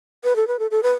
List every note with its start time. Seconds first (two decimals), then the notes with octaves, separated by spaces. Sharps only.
0.24 B4
0.36 A4
0.48 B4
0.59 A4
0.71 A4
0.83 B4